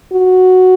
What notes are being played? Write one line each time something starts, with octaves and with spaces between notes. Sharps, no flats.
F#4